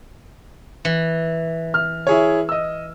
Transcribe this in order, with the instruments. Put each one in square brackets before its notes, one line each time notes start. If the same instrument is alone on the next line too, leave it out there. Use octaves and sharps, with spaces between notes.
[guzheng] E3
[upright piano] F6
E4 G#4 C#5
D#5 E6